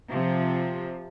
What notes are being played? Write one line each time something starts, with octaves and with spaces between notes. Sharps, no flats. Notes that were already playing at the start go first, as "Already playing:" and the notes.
C3 F3